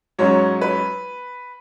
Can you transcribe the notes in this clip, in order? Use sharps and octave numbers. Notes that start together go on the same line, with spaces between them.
G#2 F#3 C#4 C#5
B4